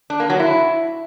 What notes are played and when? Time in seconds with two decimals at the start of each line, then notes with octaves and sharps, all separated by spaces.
0.10 D4
0.20 A#3
0.30 F#3
0.39 E4